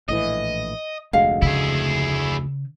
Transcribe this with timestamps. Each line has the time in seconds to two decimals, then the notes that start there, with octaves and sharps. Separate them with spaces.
0.09 A#1 A2 E3 D#5
1.13 F1 D2 G#3 F5 F#5
1.42 C#3 E4 G#4